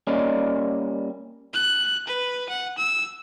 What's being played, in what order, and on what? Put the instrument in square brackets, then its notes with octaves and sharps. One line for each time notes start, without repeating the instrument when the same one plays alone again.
[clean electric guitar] G3 A#3 C#4 D5 D#5
[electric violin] F#6
B4
F#5
E6